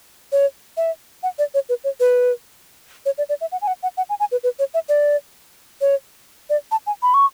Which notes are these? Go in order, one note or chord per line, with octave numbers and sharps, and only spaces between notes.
C#5
E5
F#5
D5
C#5
B4
C#5
B4
C#5
D5
D5
E5
F#5
G#5
F#5
F#5
F#5
G#5
G#5
B4
B4
C#5
E5
D5
C#5
D5
A5
G#5
B5
C#6